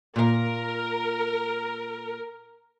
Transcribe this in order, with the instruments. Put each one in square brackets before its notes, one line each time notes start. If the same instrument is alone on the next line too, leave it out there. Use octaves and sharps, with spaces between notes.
[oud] A#2 F5 [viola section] A#4